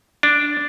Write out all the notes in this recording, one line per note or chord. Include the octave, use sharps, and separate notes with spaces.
D4